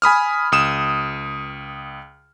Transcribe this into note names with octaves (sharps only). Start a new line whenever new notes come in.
G#5 B5 D#6 F6
C#2 D#6 E7